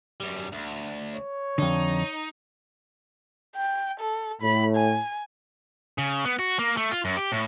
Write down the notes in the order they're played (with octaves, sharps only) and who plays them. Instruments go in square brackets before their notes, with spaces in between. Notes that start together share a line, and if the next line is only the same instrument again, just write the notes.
[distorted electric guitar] F#2 G3
D2
[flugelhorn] C#5
[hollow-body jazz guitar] F2 D3 [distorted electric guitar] D#4
[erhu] G5
A4
[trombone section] A2 [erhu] B5
[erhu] G#5
[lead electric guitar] C#3
B3
F#4
A#3
A3
F4
F#2
G4
A2